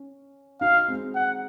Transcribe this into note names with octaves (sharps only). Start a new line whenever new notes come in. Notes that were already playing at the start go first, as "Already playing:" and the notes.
Already playing: C#4
D#4 F#4 F5
G#3 C4
F#5